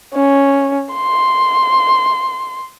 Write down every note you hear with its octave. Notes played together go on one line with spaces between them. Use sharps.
C#4
C6